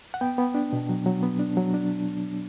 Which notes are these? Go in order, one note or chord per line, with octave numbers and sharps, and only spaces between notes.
F#5
B3 G5
B3
D4
B2
F#3
F#3
B3
D4
F#3
D4